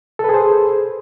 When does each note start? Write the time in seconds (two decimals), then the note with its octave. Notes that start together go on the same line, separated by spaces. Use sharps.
0.19 A4
0.24 B4
0.29 G#4
0.34 C5